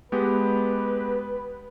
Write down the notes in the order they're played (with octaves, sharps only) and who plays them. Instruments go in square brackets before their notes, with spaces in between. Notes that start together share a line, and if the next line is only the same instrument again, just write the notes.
[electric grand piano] G#3 B3 G4 [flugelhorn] B4